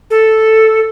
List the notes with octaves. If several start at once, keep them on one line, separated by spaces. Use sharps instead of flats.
A4